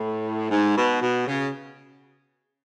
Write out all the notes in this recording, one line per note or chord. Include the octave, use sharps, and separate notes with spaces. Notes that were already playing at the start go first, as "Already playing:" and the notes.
Already playing: A2
G#2
B2
B2
C#3